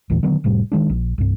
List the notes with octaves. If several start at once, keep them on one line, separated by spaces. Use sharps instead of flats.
G#1 D#2 A#2 E3
D3 D#3 F#3 B3
F1 A2 C3 G3
D#3 G#3 D4
A#1
C2 G2